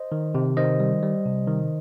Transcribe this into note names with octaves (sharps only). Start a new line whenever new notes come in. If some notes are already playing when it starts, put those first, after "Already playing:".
Already playing: C5 D#5
D#3
C3
D#3 C5 D#5
G3
G3
C3
D#3